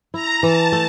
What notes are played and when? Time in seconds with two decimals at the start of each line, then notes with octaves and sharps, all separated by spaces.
0.13 E4 A#5
0.42 E3 A5
0.72 A3